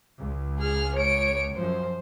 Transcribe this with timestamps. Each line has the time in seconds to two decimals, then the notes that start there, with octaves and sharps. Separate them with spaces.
0.20 C#2
0.59 G#4 F6
0.96 C#5 D7
1.56 F#2 F3 C5